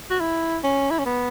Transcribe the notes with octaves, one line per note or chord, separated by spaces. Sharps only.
F#4
E4
C#4
E4
C#4
B3